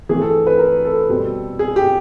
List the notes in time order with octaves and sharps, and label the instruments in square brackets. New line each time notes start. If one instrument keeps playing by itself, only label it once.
[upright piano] E3 A3 C4 G#4
A4
B4
A#4
A4
B2 G3 C4
G#4
G4